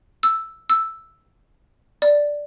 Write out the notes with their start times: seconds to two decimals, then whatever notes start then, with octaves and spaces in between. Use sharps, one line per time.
0.23 E6
0.70 E6
2.02 D5